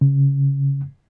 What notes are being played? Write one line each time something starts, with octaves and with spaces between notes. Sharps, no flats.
C#3